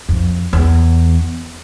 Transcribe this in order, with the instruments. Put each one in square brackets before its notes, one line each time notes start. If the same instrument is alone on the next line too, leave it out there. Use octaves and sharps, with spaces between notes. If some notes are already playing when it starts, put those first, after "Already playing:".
[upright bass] F2
E2